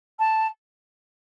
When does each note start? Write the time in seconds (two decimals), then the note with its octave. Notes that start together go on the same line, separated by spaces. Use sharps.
0.19 A5